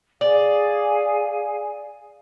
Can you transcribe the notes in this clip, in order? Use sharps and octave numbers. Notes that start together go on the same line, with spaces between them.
G#4 D5 F5 G#5